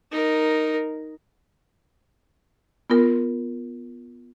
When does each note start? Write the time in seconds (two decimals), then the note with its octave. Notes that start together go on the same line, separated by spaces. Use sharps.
0.12 D#4 A#4
2.90 B3 F4 A#4